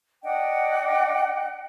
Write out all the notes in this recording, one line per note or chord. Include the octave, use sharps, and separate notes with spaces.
D4 D#5 F#5 G5